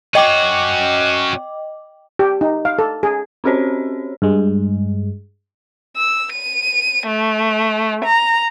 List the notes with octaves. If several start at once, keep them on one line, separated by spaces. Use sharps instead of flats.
C#4 F#4 D#5 G5 D6
G4
D#4
F5
A4
G#4
C4 C#4 F#4 G4 C5 C#5
G2 G#3
E6
D#7
A3
A#5